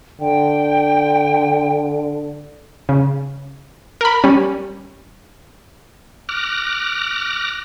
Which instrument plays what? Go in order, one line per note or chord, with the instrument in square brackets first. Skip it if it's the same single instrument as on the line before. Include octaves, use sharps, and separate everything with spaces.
[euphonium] D3 [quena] G5
[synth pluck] C#3
A#4 B5
G3 C#4
[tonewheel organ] D6 F6 F#6 A#6